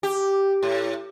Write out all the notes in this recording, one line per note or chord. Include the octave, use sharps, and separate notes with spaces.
G4
A2